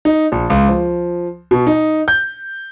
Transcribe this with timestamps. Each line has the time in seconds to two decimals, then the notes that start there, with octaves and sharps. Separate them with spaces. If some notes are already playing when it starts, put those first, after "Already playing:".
0.05 D#4
0.32 A#1
0.50 C#2
0.68 F3
1.51 B2
1.67 D#4
2.08 G6